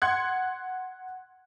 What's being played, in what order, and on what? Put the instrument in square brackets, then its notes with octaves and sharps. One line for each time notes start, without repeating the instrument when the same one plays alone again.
[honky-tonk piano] F#5 C6 F#6 G#6 C#7